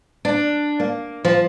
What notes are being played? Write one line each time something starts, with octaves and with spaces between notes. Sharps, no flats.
D4
A#3
F3